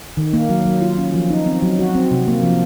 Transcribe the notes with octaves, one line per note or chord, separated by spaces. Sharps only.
D#3
A#3
F#3
F#3
F4
C#4
F3
D#4
C4
F#3
F#4
C4
C3
A#3
F3